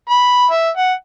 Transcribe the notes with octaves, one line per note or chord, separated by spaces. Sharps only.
B5
E5
F#5